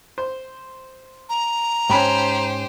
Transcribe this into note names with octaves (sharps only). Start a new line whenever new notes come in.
C5
A#5
G#2 C#4 G4 C5 G5 A5 B5